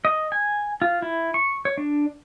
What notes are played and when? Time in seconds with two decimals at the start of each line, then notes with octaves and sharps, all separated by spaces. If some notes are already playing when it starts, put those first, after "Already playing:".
0.05 D#5
0.32 G#5
0.82 F4
1.02 E4
1.34 C#6
1.65 C#5
1.78 D4